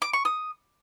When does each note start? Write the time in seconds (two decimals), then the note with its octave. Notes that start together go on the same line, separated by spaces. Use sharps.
0.02 D6
0.13 C#6
0.25 D#6